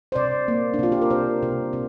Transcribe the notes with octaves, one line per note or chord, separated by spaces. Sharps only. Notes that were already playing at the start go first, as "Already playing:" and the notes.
C5
C3 D5
A#3
D4
C3 F4
G4
A#4
C3 C5
C3
C3